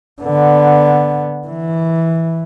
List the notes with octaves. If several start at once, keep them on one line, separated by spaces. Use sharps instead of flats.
D3 B3
E3